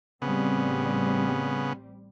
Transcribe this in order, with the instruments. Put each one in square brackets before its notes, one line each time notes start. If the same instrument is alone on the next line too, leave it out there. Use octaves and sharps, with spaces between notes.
[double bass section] A1 G3 C4 [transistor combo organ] C#3 B3